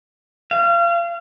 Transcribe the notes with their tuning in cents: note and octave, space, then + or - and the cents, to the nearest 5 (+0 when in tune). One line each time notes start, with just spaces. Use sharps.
F5 -35